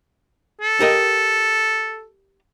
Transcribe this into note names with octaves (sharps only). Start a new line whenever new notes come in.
A4
G4 A#4 D#5